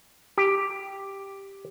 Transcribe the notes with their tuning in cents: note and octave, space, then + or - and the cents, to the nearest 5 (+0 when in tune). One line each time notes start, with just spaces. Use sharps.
G4 +5